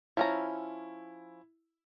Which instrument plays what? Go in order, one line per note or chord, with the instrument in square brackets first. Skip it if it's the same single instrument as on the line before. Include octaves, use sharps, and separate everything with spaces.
[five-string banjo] F3 C#4 A#5 [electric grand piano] E4